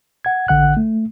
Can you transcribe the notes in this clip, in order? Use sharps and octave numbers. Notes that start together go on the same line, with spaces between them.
F#5 G#6
A1 D3 F#5 F#6
A3